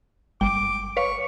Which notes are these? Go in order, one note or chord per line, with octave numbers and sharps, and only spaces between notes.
G1 G5 D6
B4 C#5 F5 C#6